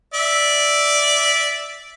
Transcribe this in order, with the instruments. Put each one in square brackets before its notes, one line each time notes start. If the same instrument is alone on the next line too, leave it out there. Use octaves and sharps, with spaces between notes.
[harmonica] D5 E5